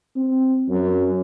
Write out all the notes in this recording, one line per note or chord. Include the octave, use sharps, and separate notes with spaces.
C4
F#2